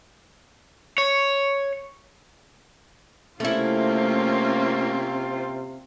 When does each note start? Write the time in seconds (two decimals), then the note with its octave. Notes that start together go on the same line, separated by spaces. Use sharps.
0.98 C#5
3.40 C3 A3 A#3 C4 C#4 E4 F4